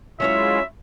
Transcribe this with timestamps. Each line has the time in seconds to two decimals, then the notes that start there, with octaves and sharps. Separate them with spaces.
0.20 F#3 G#3 C#4 E4 F4 C#5 E5